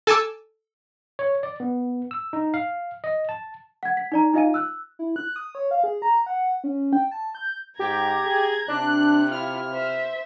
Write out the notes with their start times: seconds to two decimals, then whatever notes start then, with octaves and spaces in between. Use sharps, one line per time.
0.07 A4 G#5 A5 D6 E6
1.19 C#5
1.43 D5
1.60 B3
2.11 E6
2.33 D#4
2.54 F5
3.04 D#5
3.29 A5
3.83 F#5 G#6
3.97 B6
4.12 D#4 D5 A#5
4.34 D#4 F4 D#5 F5 G#5 D#7
4.54 E6 F#6
4.99 E4
5.16 F#6
5.36 D#6
5.55 C#5
5.71 F5
5.84 G#4
6.02 A#5
6.26 F#5
6.64 C#4
6.93 G5
7.11 A5
7.35 G6
7.79 G#2 G4 A#5 G#6
8.25 G#4
8.68 C3 D4 F#6
9.31 E4 F4 F6
9.71 C5 E5